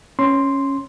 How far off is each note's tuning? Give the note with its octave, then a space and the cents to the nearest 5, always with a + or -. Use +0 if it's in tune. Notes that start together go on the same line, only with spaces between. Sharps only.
C#4 -5 C6 +0